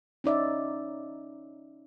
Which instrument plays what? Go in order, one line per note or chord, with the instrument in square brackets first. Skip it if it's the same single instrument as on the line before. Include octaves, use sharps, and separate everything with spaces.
[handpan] C#4 D#4 D5 E5